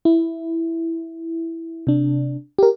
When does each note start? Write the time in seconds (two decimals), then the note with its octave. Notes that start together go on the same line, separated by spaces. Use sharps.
0.05 E4
1.87 C3 D4
2.59 G4 A#4